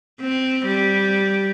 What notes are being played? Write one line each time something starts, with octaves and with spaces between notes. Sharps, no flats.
C4
G3